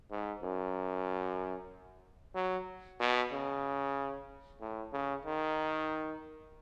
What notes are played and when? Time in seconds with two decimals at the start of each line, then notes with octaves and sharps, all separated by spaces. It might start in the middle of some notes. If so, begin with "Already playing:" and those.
0.11 G#2
0.43 F#2
2.35 F#3
3.00 B2
3.31 C#3
4.61 A2
4.93 C#3
5.25 D#3